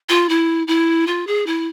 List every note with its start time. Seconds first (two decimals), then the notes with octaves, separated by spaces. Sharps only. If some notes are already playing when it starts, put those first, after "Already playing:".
0.09 F4
0.29 E4
0.67 E4
1.07 F4
1.27 G#4
1.46 E4